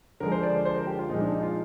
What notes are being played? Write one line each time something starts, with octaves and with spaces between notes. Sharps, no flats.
D3 F3 G#3 A#4
C5
D5
C5
C5
A#4
G4
F4
A#2 F3 G#3 D#4
D4
D#4
F4